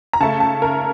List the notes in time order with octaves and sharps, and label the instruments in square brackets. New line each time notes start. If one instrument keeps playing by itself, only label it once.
[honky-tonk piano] A#5
C#3 A3 A5
A5
A#4